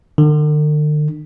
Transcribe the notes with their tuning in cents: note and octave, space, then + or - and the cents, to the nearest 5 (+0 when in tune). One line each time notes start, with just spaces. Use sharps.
D3 +45